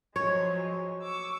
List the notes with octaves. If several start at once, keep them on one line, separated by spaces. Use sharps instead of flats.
F3 F#3 G#3 C#5
C#6 D6 E6